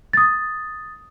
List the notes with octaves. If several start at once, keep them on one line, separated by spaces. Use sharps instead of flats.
D#6 A6